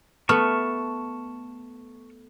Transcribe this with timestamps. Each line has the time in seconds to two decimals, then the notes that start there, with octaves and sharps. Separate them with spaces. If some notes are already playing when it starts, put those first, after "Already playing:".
0.29 A3 B3 A5 C#6 F6